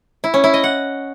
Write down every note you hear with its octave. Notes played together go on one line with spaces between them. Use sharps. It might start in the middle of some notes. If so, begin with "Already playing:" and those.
E4
C#4
E4
D#5
F#5